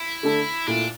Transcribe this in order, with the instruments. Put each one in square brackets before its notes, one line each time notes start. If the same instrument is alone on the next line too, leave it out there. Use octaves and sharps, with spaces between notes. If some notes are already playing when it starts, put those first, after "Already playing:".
Already playing: [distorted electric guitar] E4
[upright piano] D3 A3 D4 A4
[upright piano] A#2 A3 E4 [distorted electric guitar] D4